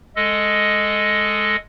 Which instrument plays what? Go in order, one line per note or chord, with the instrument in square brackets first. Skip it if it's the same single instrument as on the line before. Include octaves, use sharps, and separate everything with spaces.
[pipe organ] G#3 A4 D#5